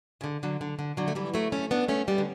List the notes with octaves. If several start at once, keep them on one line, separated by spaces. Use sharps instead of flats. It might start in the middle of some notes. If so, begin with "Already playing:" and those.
C#3
D3
D3 F#3
D3
D3
D3 F#3
A3
E3 G3
F#3 A3
A3 C#4
B3 D4
A3 C#4
G3 B3
D3